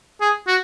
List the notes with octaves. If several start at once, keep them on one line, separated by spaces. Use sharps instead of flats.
G#4
F#4